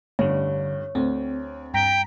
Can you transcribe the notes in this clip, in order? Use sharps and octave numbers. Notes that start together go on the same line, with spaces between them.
A1 G2 D3 G3 C#5
D2 C4
G2 G5 A#5 B6